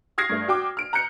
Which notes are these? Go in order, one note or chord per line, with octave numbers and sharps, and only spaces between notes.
D#6 F6 G#6 A#6 C7
G2 A3
F#4 G5 D6
F6 D7
A#5 F#6 G6 C#7